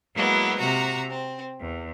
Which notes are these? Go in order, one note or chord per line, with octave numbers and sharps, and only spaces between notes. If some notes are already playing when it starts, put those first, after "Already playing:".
F#3 G#3 A#3 B3 E4
C3 F#4 A#5
C4
E2